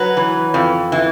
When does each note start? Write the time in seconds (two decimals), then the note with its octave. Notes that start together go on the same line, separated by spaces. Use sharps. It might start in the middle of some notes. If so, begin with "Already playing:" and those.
Already playing: F#3 B4
0.17 E3
0.54 F2
0.92 E3